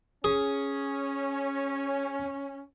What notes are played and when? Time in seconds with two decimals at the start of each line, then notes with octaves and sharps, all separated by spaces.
0.24 C#4 G#4